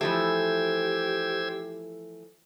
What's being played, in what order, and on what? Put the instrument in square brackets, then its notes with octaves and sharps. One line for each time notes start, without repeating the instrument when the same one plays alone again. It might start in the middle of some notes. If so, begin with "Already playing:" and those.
[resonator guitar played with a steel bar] E3 F3 A3 [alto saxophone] G4 [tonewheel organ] C5 E6 G#6